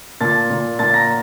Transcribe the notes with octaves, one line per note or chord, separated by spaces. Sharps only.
A#2 A5 A6
A#2
A#2 A5 A6
A#5 A#6